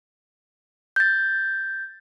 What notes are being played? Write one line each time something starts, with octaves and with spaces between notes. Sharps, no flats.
G6 A6